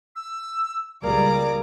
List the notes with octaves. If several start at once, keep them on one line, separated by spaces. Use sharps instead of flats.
E6
C#2 G3 A#3 G#4 D5 A#5 D6